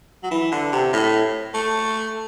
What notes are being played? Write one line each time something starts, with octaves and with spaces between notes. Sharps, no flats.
F#3
E3
D3
C3
A2
A3